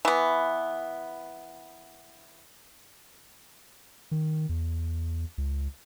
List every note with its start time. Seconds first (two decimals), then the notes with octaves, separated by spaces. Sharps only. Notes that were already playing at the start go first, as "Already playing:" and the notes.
0.05 E3 B3
4.11 D#3
4.49 E2
5.38 C#2